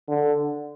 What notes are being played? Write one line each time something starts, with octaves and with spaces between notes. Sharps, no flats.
D3